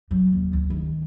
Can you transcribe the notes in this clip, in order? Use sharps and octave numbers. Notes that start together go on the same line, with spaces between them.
F#3
D#2
D2
D#3